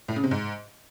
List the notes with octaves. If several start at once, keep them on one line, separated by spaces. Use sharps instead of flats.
A2
C#3
C3
G#2